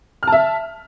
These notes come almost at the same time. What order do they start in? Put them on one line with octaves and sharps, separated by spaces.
F6 A5 E5